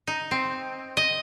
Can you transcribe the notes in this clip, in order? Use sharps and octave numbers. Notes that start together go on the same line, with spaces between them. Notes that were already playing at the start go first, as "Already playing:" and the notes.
D#4
C4
D#5